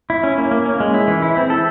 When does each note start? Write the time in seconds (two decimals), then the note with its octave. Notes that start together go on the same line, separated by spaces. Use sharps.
0.10 E4
0.23 C#4
0.38 A#3
0.51 A#3
0.65 C#4
0.80 G#3
0.94 E4
1.08 E3
1.22 E4
1.37 C4
1.50 A4